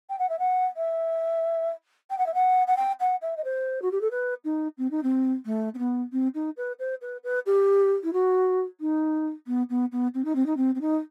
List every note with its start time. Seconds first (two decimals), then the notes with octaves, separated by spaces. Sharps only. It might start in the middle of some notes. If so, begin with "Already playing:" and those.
0.09 G5
0.18 F#5
0.29 E5
0.39 F#5
0.76 E5
2.10 G5
2.18 F#5
2.26 E5
2.34 F#5
2.67 F#5
2.76 G5
3.00 F#5
3.21 E5
3.37 D#5
3.44 C5
3.82 F#4
3.91 G4
4.01 A4
4.10 B4
4.44 D#4
4.78 C4
4.90 D#4
5.03 C4
5.45 A3
5.74 C4
5.78 B3
6.12 C4
6.34 D#4
6.57 B4
6.79 C5
7.01 B4
7.23 B4
7.46 G4
8.03 E4
8.13 F#4
8.80 D#4
9.47 B3
9.69 B3
9.92 B3
10.14 C4
10.24 D#4
10.35 C4
10.46 D#4
10.56 C4
10.75 C4
10.81 D#4